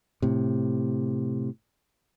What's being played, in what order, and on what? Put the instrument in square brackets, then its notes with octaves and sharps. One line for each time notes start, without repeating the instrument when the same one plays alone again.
[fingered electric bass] A2 C3